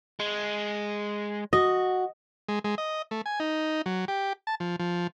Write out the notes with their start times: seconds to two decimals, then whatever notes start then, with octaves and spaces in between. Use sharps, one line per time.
0.20 G#3
1.53 F#4 D#5
2.49 G#3
2.64 G#3
2.78 D#5
3.11 A3
3.26 G#5
3.40 D#4
3.86 F#3
4.08 G4
4.47 A5
4.60 F3
4.79 F3